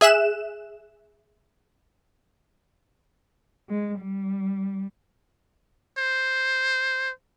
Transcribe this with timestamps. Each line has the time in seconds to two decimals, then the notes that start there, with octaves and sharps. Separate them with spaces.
0.01 G#4 E5 F#6 E7
3.69 G#3
4.00 G3
5.98 C5